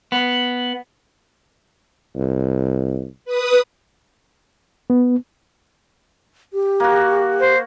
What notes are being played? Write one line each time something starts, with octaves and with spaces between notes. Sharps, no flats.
B3
C2
B4 D#6
B3
G4
A#3 F#4
C5